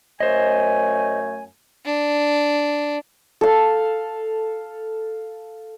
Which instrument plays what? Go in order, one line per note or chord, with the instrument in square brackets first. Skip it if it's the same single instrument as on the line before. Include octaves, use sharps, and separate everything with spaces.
[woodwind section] F#2 A3 G#5 [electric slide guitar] C5 D#5
[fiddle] D4
[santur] A4 F5